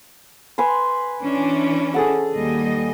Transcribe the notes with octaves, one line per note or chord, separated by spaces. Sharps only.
B4 G#5 C6
E3 C#4 D4
G#4 A4 F#5
D#2 G3 D#5